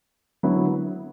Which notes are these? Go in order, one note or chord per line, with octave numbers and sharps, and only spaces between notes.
D3 F#3 B3 E4 B4